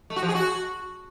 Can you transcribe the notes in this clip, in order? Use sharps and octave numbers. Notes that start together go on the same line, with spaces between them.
A3
F#4
F3
G#4
F#4